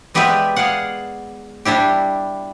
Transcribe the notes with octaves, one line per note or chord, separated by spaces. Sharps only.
G#3 B3 G4 B4 D5 E5
G#4 D5 F5 F#5
G3 D4 E4 G4